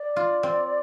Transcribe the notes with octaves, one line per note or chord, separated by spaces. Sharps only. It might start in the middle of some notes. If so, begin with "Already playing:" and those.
Already playing: D5
F4
C4